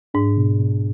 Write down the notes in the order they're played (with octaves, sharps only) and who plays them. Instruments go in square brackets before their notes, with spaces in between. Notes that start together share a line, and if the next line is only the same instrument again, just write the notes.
[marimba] G#2 [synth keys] D4
[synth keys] B2
B2